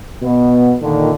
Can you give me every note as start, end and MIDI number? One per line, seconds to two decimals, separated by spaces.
0.22 0.74 47
0.22 0.74 59
0.81 1.10 46
0.81 1.10 50
0.81 1.10 51